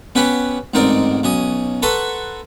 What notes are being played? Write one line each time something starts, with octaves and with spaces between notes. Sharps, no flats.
B3 C#4 G4 B4 F#5
A1 G#2 C4 D#4 A#4 D5
B1 C#4 D#6
A4 B4 F#5 A#5 C6 C#6